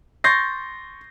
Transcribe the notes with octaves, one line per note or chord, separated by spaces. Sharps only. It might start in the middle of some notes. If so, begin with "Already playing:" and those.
C6 C#6 G6 A6 A#6 C7